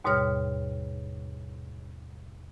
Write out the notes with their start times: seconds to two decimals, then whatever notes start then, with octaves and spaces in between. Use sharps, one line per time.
0.04 D#2 G#2 B2 G3 C#5 F6